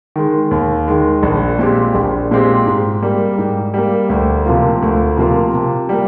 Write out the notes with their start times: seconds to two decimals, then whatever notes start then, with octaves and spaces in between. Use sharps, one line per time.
0.16 D#3 G#3
0.51 D#2
0.88 D#3 G#3
1.23 A#1
1.59 A#2 G#3 C4 G4
1.95 A#1
2.31 A#2 G#3 C4 G4
2.66 G#2
3.02 G3 A#3
3.38 G#2
3.74 G3 A#3
4.09 D2
4.46 C3 F3 A#3 F4
4.82 D2
5.17 C3 F3 A#3 F4
5.54 C3
5.89 G3 A#3